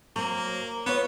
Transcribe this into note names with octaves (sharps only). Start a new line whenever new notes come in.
F#3 A#3 C4
B3 F4 B4 C#5